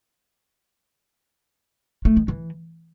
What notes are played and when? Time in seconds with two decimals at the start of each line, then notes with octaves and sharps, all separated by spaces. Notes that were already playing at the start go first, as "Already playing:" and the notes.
2.05 A3
2.17 D#3
2.28 E3